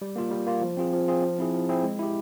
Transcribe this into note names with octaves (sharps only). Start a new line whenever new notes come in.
G3
A#3 F4
G3
A#3 F4
F3
C4 F4 G#4
F3
C4 F4 G#4
F3
C4 E4 G#4
F3
C4 E4 G#4
G#3
E4 G4